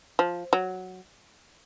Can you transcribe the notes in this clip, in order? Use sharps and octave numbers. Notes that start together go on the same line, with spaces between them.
F3
F#3